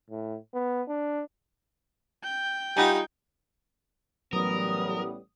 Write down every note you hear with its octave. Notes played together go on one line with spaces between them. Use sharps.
A2
B3
D4
G5 G6
G3 D#4 F4 F#5 G#5
A1 F#3 G3 B3 A#4 D#6